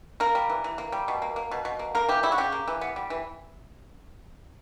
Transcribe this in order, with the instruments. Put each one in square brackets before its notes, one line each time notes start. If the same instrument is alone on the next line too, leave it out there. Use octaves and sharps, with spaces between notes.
[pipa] A#3 A#4
G3
E3
E3
A#3
G3
B2
A#3
A#3
B2
B2
A#3
A#3 A#4
E3 G4
C#3 E4
F#4
C#3 G4
A#3
E3
B3
G3
E3